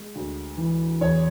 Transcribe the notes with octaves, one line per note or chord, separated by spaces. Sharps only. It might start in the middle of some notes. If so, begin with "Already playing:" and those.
Already playing: G#3
D2
E3
E2 C#5